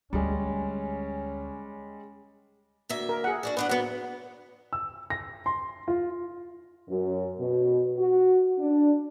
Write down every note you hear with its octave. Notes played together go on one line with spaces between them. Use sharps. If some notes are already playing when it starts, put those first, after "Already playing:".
D2 G3 G#3 C#4
D2 A#3 E5
A#4
G#4 F#5
D4 F#4 D5
B3 D4 B4 F#5
F#3 B3 F#5
E6
A#6
C6
F4
F#2
B2
F#4
D4